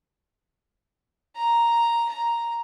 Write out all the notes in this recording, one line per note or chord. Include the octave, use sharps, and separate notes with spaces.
A#5
A#5